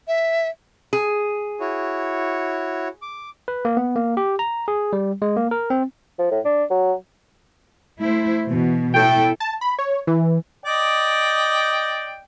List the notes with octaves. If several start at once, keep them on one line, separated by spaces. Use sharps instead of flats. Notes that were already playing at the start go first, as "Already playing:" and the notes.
E5
G#4
E4 F#4 C#5
D6
B4
A#3
B3
A#3
G4
A#5
G#4
G3
G#3
A#3
A#4
C4
F3
A2
D4
F#3
A3 E4 C5
B2 E3
A2 E4 A4 G5
A5
B5
C#5
E3
D5 D#5 G5